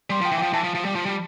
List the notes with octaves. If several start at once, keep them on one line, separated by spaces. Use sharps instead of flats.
G3 C6
F3
G5
E3
F3 G5
E3 A5
F3
F3
G3
F3
G3